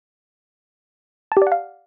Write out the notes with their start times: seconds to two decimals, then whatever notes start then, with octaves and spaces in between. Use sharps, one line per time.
1.32 A5
1.37 G4
1.42 D5
1.47 F#5
1.52 F5